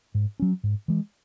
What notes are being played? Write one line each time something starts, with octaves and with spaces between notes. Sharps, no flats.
G#2
F#3 C#4
G#2
E3 G#3